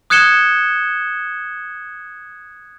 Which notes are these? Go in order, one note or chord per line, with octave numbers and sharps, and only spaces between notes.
D#6 F#6 G#6 C#7 E7 G7